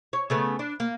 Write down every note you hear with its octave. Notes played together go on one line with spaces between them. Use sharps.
C#5
C#3 A3 B3
D4
A#3